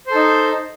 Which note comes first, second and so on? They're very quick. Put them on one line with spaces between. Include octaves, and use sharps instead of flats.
C5 A4 D#4